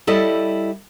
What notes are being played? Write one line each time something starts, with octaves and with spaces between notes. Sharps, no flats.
G3 E4 A4 D5 D#5